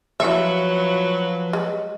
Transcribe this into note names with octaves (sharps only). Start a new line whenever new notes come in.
F3 F#3 E4 B4 E5
G#3